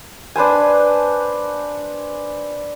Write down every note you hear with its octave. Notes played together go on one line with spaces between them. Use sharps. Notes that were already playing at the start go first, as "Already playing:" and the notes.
D4 B4 C5 G#5